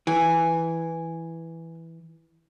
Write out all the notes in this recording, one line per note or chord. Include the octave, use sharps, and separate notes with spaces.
E3 G#5